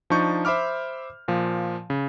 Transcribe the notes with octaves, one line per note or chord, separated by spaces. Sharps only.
F3 D4 D#4 C#6 G6
C5 E5 B5 D6 F6
A#2 F3
C#3